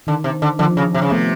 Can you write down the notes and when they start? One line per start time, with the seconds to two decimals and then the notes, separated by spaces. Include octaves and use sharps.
0.07 D3 D#3
0.24 C3
0.42 D3
0.59 D3 F3
0.77 C#3
0.94 C3
1.02 C#3
1.10 C3 A3 B3